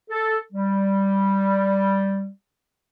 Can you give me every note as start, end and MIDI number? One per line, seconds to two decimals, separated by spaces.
0.10 0.36 69
0.53 2.28 55